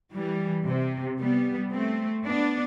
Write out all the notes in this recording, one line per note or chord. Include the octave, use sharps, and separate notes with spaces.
E3 G3
C3
G3 B3
A3 C4
B3 D4